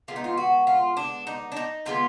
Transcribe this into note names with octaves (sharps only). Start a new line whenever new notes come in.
D3 G#3 B3 F4
D#4
F4
F#4
F4
D4
D#4
D4
D#4
D3 G#3 B3 F4